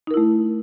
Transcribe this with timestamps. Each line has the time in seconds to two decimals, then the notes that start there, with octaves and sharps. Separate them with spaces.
0.07 D#4
0.11 A#4
0.14 E4
0.17 A3